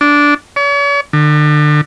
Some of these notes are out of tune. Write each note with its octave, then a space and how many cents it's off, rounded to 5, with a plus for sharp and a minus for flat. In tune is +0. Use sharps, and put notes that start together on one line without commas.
D4 -10
C#5 +40
D3 +35